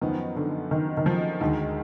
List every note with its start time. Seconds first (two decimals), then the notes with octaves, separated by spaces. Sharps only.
0.01 F#2 D#3 F3 B3
0.36 D3
0.71 D#3
0.97 D#3
1.06 F3
1.41 D2 D3 D#3 G#3